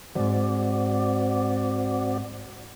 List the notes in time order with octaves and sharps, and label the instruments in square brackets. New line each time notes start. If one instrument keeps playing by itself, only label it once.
[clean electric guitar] E2 G#2 [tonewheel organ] C4 F#4 D5